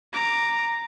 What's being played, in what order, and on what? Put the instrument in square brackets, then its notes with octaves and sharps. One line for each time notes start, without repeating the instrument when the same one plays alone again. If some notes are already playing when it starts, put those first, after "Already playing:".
[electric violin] A#5 D6